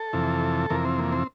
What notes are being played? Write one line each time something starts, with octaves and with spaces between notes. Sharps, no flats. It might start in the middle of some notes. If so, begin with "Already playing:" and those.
Already playing: A4
F2 C3 E3
F2 C3 E3 A#4
C4
A#3
C4